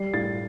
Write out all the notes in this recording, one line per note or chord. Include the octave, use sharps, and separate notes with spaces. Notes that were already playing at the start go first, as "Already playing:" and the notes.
Already playing: G3 C7
A2 A6